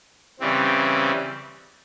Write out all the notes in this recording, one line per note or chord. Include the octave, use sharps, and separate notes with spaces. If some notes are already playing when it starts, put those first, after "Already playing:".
C#3 E3 G3 C4